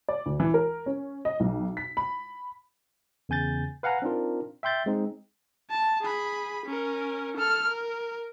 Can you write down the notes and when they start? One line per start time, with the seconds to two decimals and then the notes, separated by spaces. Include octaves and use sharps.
0.09 D5
0.26 D2
0.40 E3
0.54 A#4
0.86 C#4
1.25 D#5
1.40 B1
1.77 B6
1.97 B5
3.29 E2 C#3 G#5 G6 A6
3.83 B4 F5 F#5 G#5 A#5
4.02 C4 D4 D#4 F4 A#4
4.63 E5 G5 C6 G6 A6
4.86 G#3 C4 D#4
5.70 A5
6.02 G#4 B5
6.66 C#4 A#4
7.37 A4 F6
7.68 A#4